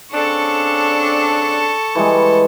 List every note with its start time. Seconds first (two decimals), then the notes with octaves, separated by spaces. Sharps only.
0.13 C#3 C4 D4 A4 C#6
1.95 E3 G3 G#3